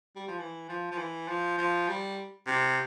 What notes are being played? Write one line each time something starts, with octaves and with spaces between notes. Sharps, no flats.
G3
F3
E3
F3
F3
E3
F3
F3
G3
C3